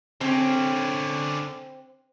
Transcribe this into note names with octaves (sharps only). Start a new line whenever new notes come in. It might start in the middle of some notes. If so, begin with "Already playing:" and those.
D3 C4 C#4